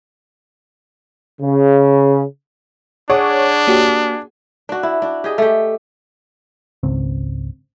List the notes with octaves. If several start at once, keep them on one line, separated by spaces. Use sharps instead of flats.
C#3
D4 G#4 C#5 F#5 D6
A#3 F#4 G4
D4 F#4
E4
D4 F#4
G4 G#4 D#5
A3 G4
G#1 C#2 C4